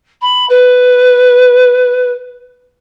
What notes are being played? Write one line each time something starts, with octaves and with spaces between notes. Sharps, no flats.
B5
B4